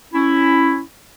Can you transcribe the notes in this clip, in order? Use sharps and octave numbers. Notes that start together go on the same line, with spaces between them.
C#4 E4